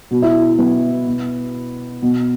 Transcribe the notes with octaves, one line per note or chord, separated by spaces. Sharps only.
B2 F#4
E4
B3
B2
B2